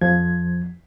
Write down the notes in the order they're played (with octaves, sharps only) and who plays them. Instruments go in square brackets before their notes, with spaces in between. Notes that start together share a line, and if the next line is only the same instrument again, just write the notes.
[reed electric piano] F2 F3 G#6